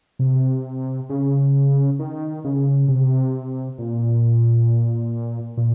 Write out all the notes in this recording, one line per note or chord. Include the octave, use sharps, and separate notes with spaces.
C3
C#3
D#3
C#3
C3
A#2
A#2